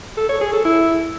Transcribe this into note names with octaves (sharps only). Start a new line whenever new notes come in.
A4
C#5
G#4
A4
E4